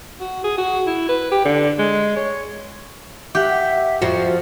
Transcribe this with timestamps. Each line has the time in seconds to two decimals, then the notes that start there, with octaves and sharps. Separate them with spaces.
0.20 F#4
0.44 G#4
0.58 F#4
0.87 E4
1.09 B4
1.32 G4
1.45 D3
1.79 G#3
2.16 C#5
3.35 G4 E5 F#5
4.02 F2 F3 F#4